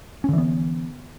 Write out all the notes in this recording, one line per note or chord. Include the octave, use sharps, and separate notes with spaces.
D3 E3 B3 C#4